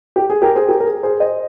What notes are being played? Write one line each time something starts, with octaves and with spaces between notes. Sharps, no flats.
G4
G#4
G4 A#4
G#4 C5
G4 A#4
A#4
G#4
G#4 C5
C5 D#5